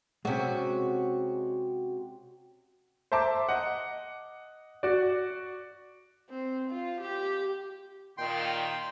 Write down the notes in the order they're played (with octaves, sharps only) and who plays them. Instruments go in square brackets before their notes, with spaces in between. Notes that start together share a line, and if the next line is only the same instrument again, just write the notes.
[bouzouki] C3 F#4 [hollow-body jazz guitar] G#3 C#4
[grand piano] C5 E5 A5 A#5 D6
D#5 F#5
F#4 D5
[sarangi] C4
F4
G4
[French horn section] A#2 D#3 [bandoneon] G5 C6